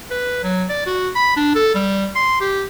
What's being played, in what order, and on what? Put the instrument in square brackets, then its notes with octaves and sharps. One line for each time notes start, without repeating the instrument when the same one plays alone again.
[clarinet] B4
F#3
D5
F#4
B5
D4
A4
G3
C6
G4